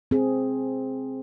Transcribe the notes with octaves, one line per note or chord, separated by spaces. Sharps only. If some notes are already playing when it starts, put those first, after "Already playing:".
C4 G#4